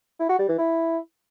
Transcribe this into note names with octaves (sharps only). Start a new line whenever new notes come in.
E4
F#4
G3
E3
E4